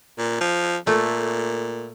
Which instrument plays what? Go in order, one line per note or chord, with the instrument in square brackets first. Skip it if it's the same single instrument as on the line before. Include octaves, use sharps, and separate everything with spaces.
[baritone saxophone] A#2
F3
[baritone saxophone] A#2 [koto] A3